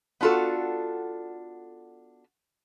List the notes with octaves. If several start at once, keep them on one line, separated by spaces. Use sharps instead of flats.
B3 D4 F4 F#4 A4